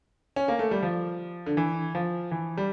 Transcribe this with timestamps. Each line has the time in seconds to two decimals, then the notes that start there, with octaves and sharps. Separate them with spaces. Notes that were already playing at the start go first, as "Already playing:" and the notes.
0.36 C#4
0.48 A#3
0.59 A3
0.71 G3
0.83 F3
1.46 D3
1.57 E3
1.95 F3
2.31 E3
2.57 G3